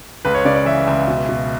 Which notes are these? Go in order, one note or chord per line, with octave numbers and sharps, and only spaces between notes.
C#2 B4
C#5
C#3 D5
D5
E3 E5
C#2 E5
B2
B2